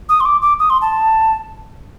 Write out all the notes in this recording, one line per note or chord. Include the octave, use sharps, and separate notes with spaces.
D#6
C6
D6
D6
D#6
C6
A5